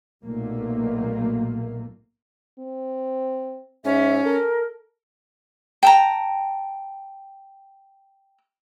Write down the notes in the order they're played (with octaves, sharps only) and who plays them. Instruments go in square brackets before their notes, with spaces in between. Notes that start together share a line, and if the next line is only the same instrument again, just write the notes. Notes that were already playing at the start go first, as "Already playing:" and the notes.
[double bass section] B1 A#2 A3 A#3
[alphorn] C4
[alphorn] G#2 [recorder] C#4 [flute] E5
[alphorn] A4 [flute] A#4
[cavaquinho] G5 A5 A#5